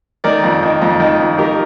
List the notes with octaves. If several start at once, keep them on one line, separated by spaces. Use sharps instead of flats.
D#3 A#4 D5
F2
D#3
F2
D#3
F2
D#3 G4 A#4